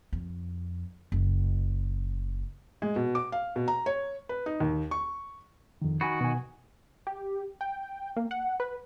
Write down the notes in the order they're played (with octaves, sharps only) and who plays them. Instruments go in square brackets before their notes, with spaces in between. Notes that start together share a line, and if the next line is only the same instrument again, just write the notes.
[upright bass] F2
F#1
[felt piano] G#3
B2
D6
F5
B2
A#5
C#5
B4
D#4
D#2
C#6
[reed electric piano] F2 D#3
[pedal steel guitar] D#3 F#4 [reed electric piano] G#5 B5
[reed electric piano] B2 G#5
[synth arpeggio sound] G4
G5
A#3
F#5
B4